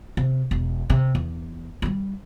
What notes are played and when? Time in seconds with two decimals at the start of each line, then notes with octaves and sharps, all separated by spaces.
0.17 C3
0.51 E1
0.90 C3
1.15 E2
1.82 F#3 G3